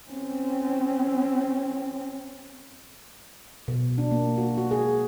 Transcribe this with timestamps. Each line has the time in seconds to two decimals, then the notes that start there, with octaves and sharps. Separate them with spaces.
0.11 C4 C#4
3.68 B2
3.98 D4
4.11 A#3
4.38 F#4
4.58 F#4
4.71 G#4